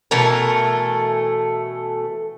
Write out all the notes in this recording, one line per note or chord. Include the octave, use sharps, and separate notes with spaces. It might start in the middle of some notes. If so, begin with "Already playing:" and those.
B2 E3 A3 A#4